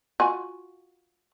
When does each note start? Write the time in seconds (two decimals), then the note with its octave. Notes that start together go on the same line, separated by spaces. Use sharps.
0.20 F4 F#4 G#5